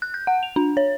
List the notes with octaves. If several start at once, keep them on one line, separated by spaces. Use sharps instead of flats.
F#6
G6
F#5
F7
D4
C#5